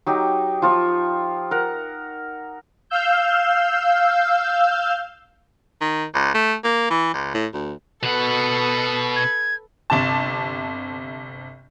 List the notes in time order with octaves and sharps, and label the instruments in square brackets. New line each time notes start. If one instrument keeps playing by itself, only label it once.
[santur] F#3 D#4 G4
F3 F4 C#6
A#4 F#5
[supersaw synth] F5 E6 G6
[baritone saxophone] D#3
C#2
A3
A#3
E3
C#2
A2
D2
[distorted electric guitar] B2 F#5 [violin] A4 B4
[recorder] G#6
[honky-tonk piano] G1 C3 A5